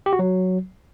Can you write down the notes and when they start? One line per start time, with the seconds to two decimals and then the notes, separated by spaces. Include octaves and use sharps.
0.06 G4
0.13 F#4
0.19 F#3